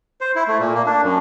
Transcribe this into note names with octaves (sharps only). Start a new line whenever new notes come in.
C5
E4
A3
A#2
A#3
D4
F#2